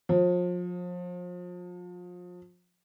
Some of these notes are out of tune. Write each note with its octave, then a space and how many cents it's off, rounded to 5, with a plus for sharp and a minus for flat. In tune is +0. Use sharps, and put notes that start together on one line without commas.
F3 +35